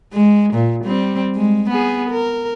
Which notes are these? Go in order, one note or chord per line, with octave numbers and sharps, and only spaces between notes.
G#3
A#2
G3 C4
G#3
B3 G#4
A#4